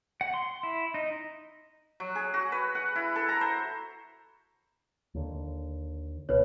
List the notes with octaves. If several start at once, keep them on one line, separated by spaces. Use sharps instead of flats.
F#5
C6
E4
D#4
F#3
G#4
F#4
B4
F#5
E4
A4
A#5
C5
D#2 D3
D1 C2 B2 B4 C#5